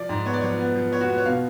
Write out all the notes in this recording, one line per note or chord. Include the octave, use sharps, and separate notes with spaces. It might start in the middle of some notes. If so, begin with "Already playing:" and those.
Already playing: F3 D5
G#2
B3 C#5
D5
F3 C#5
B3
F3
B3 C#5
F#4
B3 B4
C#5
B2 F5